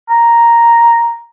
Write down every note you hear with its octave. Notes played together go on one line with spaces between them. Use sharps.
A#5